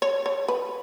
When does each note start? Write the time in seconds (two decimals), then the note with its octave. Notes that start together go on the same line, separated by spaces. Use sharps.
0.02 C#5
0.26 C#5
0.48 B4